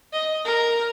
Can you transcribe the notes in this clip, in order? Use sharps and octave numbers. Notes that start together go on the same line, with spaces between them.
D#5
A#4